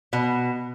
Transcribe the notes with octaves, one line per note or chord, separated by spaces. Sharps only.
B2